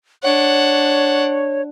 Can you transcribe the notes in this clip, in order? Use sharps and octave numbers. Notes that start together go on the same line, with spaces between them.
D4 C#5 F#5